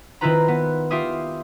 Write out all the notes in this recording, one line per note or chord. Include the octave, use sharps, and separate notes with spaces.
D#3 C4 E4 F4 B4 A#5
B3
F4 G4 E5 F5 D#6